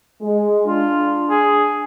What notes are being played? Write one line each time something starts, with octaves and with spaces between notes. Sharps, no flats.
G#3
D4 F4
G#4